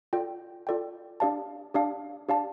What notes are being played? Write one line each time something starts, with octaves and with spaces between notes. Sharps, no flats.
F4 A4 D5 G5
F4 A4 D5 G5
D4 G4 D5 F5 A5
D4 G4 D5 F5 A5
D4 G4 D5 F5 A5